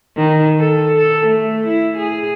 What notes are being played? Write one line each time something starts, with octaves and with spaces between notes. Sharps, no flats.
D#3
A4
A4
A3
E4
G#4